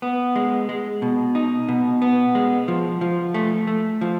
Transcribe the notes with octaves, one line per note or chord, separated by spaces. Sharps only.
B3
G#3
G#3
B2
D#4
B2
B3
G#3
F3
F3
A3
A3
F3